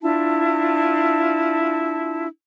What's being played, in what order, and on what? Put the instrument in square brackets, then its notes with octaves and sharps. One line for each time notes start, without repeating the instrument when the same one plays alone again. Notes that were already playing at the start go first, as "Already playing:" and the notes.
[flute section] D4 E4 F4 A5